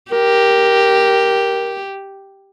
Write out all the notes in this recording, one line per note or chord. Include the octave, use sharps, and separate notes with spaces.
G4 A#4